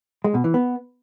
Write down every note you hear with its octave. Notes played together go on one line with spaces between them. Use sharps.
G#3
B2
E3
B3